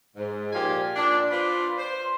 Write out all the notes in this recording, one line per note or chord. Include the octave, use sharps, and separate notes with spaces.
G#2
A#2 F3 G4 F5 G#5
A#2 D4
F4 B4 C5 D5
C5